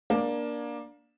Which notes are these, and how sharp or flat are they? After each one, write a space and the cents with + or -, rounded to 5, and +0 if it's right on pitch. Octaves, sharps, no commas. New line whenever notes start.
A#3 +20 D4 +0